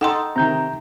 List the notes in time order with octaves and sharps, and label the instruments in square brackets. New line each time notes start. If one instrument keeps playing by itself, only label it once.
[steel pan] D#4 A4 [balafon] F#5 G5 C6
[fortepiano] C3 D#3 [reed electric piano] A#5 G6